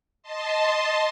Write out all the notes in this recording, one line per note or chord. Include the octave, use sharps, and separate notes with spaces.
D#5 A5 C6